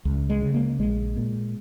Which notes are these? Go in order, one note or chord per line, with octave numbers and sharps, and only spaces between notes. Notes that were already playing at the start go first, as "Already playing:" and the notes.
C#2
G#3
C#3
A#3
A#1 G#3
A#2